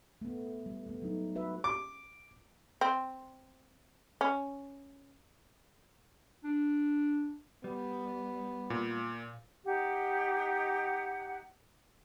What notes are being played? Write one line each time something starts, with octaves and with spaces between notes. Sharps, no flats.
A3 B3
G3
A3 B3
F#3 D#4
F#4 B4 E5
D6
C4
C#4
D4
G3 B3
A#2
D#4 G4 F#5